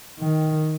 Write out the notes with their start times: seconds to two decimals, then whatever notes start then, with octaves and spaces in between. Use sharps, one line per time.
0.19 D#3